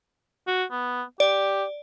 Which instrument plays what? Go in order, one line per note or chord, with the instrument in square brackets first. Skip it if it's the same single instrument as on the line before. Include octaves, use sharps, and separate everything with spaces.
[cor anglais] F#4
B3
[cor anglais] G4 [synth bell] D5